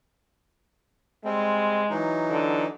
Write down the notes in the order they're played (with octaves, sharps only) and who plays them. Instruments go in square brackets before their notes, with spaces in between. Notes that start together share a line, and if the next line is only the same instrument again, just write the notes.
[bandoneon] G3 C4 [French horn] G#3
[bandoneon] E3 F#3 D#4
[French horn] D3